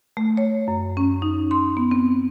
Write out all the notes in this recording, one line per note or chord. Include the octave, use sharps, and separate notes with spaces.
A3
C#5
F#2
C#4
D#4
C6
B3
C4